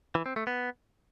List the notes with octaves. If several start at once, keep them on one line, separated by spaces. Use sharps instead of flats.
E3
C4
A3
B3